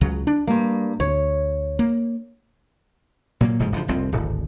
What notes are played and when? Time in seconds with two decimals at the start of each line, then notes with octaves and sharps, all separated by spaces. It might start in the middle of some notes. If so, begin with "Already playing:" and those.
0.01 C#2 C#3 F#3
0.27 D4
0.47 G2 G3 A#3
1.00 D2 C#5
1.79 A#3
3.41 A#2 F#3 A#3
3.59 F1 G#2 B2 F3
3.72 F#1 D3 D#3 F3
3.88 F1 C2 F3 C4
4.12 D1 G#1